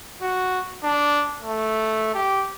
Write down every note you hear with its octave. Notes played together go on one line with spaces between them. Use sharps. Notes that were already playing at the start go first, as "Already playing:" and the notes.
F#4
D4
A3
G4